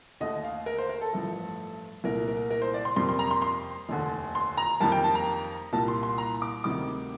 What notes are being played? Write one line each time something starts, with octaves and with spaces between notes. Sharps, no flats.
D#2 D3 A3 D#5
F5
A#4
C5
A#4
A4
A1 G2 F3 A3
C2 A#2 A3 A#4
A#4
A#4
C5
D5
C6
F2 C3 G3 A#3 C6
C6
A#5
C6
C6
F1 D#2 D3
C6
A#5
F2 D#3 G3 A#3 A5
G5
A5
A#5
C2 A#2 G3 A#3 A5
C6
C6
A#5
D6
D2 C3 D#3 G3 D6